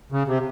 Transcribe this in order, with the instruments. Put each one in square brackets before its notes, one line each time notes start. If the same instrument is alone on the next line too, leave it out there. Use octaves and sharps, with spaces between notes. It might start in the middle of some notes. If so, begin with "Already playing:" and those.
[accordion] C#3
C3